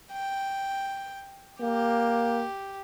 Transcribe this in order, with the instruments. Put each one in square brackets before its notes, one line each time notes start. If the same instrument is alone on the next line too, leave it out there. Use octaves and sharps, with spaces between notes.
[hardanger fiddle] G5
[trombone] A#3 [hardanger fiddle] G4